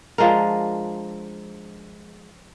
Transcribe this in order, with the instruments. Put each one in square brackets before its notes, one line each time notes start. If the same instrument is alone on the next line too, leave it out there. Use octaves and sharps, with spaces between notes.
[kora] F3 G#3 D4 A#4